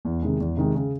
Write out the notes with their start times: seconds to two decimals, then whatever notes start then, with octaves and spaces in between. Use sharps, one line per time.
0.05 E2
0.22 C3 D#3 G#3
0.40 E2
0.57 C3 D#3 G#3
0.75 C#3